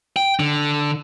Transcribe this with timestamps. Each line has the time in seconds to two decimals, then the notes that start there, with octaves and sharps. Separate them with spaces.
0.16 G5
0.40 D3